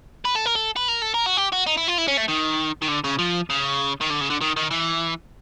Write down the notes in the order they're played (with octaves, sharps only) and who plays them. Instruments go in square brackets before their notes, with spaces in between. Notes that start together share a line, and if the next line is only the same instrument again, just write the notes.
[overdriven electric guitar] B4
A4
A#4
A4
B4
A#4
A4
A#4
F#4
G4
F#4
D#4
E4
F4
E4
C#4
A3
D#3
D#3
D3
C#3
F3
C#3
D#3
D3
C#3
D3
D#3
D#3
E3